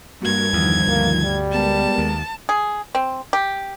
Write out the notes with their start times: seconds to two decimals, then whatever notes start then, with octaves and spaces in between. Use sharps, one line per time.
0.22 G2 A#3 F#4 A#4 G#6
0.53 E2 D#3 F3
0.88 D2 A#3
1.23 G3
1.52 G#3 B3 A#4 A5
1.98 D#2
2.49 G#4
2.95 C4
3.33 G4